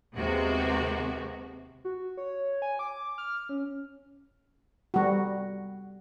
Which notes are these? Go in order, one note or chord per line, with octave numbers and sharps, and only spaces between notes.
D#2 C3 G#3 B3 F#4
F#4
C#5
G#5
D6
F6
C#4
G3 F#4